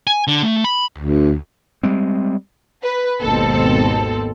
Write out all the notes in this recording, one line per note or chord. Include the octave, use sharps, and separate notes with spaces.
G#5
D3
A3
B5
D2
G3 G#3 C4
B4
G#1 D#2 B2 C4 A4